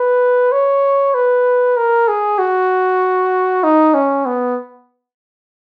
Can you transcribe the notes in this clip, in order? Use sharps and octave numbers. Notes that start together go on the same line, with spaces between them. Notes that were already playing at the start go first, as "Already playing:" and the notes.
Already playing: B4
C#5
B4
A#4
G#4
F#4
D#4
C#4
B3